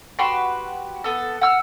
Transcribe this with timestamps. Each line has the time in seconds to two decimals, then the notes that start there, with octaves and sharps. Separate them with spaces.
0.19 F#4 G4 B4 C6
1.04 B3 A4
1.41 F#5 E6 F6